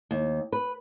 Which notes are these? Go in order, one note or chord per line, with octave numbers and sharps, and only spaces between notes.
D#2
B4